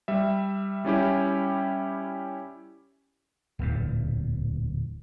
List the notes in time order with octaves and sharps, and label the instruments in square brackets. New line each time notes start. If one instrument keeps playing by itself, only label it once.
[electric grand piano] G3 E5
G3 C#4 E4 G4
[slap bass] D1 E2 A#2